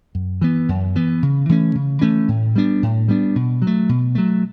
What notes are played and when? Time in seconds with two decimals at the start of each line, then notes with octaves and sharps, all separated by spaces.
0.15 F#2
0.41 E3 B3
0.69 F#2
0.96 E3 B3
1.23 C#3
1.49 E3 A3 C#4
1.75 C#3
2.01 E3 A3 C#4
2.28 A2
2.55 G3 B3 D4
2.83 A2
3.08 G3 B3 D4
3.36 B2
3.62 F#3
3.67 A3
3.89 B2
4.15 F#3 A3